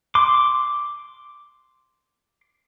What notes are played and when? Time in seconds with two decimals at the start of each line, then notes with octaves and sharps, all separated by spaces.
0.15 C6 D6